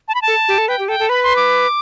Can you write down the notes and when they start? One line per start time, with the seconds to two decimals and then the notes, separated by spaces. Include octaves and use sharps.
0.08 A5
0.15 B5
0.22 A5
0.27 A4
0.48 G4
0.58 A4
0.68 B4 G5
0.79 G4
0.88 A4 G5
0.99 A4
1.09 B4 B5
1.23 C6
1.36 D6